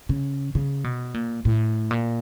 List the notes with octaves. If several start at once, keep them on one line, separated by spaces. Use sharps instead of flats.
C#3
C#3
B2
A#2
A2
A#2